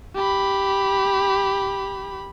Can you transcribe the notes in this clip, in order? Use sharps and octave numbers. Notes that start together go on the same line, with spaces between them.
G4 B5